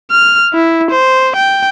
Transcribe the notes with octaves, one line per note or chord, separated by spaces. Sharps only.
F6
E4
C5
G5